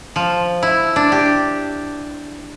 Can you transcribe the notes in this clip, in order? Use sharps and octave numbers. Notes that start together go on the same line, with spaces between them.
F3
E4
D4
G4